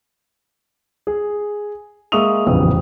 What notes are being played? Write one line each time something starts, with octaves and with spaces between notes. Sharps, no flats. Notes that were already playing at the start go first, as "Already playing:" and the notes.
G#4
G#3 A#3 E5 C#6 D#6 F7
D#1 A1 F2 C#3 B3 D#6